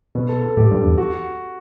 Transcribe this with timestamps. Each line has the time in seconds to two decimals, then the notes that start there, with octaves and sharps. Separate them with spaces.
0.15 B2 B4
0.29 A4
0.42 A4
0.57 A2 G4
0.71 G2
0.84 E2
0.98 F#4